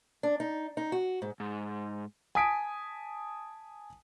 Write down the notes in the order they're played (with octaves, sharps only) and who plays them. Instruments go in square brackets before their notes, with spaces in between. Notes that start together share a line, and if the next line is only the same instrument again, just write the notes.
[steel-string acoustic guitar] D4
D#4
D#4
F#4
G#2
[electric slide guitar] G#2
[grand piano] G#5 A5 D#6 B6 D7